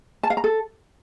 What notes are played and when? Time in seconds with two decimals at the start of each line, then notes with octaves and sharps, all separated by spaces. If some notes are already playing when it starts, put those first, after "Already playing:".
0.23 A5
0.30 F5
0.37 A#5
0.44 A4